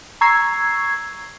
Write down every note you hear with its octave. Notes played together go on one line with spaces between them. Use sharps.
A#5 C#6 E6 G#6 C7